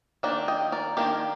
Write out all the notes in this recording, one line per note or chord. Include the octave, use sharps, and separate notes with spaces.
D#3 A#3 D4
D#5 G5
A#4 D5
D#3 A#3 D4 G4 A#4